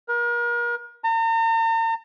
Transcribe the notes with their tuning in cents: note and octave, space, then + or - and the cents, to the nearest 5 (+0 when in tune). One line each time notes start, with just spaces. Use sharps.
A#4 +35
A#5 -45